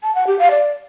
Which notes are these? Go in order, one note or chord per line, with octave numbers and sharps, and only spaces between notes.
A5
F#5
G4
F5
D5